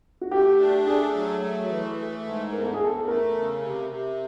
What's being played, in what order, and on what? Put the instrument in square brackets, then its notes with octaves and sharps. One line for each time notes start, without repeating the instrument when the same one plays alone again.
[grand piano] F#4
[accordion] A3 [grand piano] G4
[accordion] D4
[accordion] A3 [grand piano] G#4
[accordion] F#3
A3
E3
A3
G#2
[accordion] E2 [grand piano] A#4
[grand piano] A4
G#4
[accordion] E2 [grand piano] A4
[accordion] A3 [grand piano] A#4
[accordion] C#3
C3
C3